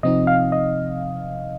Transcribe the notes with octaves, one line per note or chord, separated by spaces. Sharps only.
C3 F3 C4 D#4 D#5
F5
D#5